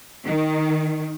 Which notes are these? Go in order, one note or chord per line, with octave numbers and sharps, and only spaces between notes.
D#3